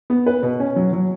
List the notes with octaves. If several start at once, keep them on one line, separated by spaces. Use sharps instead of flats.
B3
B4
B2
C#4
F#3
F#3